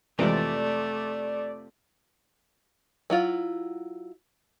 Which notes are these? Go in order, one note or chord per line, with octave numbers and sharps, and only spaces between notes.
F2 C3 E3 G#3 A3 D5
F#3 E4 F4